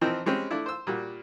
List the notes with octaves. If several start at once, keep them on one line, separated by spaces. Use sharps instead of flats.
E3 F3 C4 D#4 A#4 C5
G3 G#3 C4 C#4
A3 D4 E4
C5 E6
A#2 G3 F#4